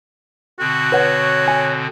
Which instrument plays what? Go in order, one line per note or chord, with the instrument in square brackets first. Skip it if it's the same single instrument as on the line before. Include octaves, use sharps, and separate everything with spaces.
[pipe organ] B2 D3 C4 [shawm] F#4
[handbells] B4 F#5 [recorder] C#5
[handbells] G#5